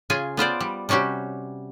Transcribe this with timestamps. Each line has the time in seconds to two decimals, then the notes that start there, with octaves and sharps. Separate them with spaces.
0.10 C#3 F4 G#4 G#5
0.37 B3 F4 C5 D5
0.60 G3
0.89 C3 G3 C#4 F#4 G4